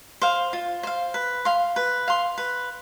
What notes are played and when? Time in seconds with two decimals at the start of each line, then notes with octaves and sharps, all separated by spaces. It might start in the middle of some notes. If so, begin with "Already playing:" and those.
0.22 C5 F5
0.53 F4
0.83 C5 F5
1.14 B4
1.45 F5 C6
1.76 B4
2.08 F5 C6
2.38 B4